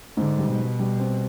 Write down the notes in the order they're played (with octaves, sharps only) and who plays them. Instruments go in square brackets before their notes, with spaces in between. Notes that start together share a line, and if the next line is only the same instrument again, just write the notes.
[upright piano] G#2 [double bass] D3
[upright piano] G3
[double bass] B2
[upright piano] G3
G3
C4